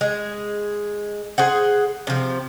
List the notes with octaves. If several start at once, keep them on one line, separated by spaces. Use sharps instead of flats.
G#3 G#4
G#4 C5 F#5
C3 F3